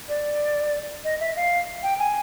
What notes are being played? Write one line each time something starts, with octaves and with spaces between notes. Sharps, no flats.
D5
D#5
E5
F5
G5
G#5